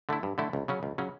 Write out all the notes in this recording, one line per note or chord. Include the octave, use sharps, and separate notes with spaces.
D3 A3 E4
G2
D3 A3 E4
C#2
C#3 F#3 C#4
C#2
C#3 F#3 C#4